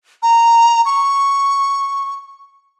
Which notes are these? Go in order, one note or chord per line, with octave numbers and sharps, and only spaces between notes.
A#5
C#6